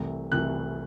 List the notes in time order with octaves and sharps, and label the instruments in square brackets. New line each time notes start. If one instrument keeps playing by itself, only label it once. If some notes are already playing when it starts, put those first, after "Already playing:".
Already playing: [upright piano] C2 C3 E3 A3
C2 C3 E3 A3 F#6